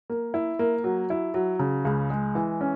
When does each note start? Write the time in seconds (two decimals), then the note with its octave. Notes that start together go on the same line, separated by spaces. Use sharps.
0.10 A#3
0.34 E4
0.59 A#3
0.84 F#3
1.10 E4
1.34 F#3
1.59 C#3
1.85 C#2
2.10 G#3
2.35 E3
2.61 C#4